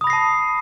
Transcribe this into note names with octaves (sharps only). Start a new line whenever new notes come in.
A5 B5 D#6 A#6 C7